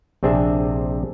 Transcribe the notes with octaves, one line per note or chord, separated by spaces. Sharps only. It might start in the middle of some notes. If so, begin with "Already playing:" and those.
A#1 C3 C4 D4 G#4 E5